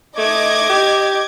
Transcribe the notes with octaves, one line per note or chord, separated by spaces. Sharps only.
A3 D#5 D6 G#6
G4